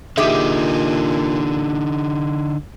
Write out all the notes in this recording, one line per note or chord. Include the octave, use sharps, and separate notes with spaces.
A#2 D3 D#4 G4 G#4 E5